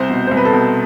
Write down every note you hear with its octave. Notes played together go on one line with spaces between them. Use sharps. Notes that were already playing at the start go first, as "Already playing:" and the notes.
Already playing: C2 C5
B2
C2 C5
B4
A4
B2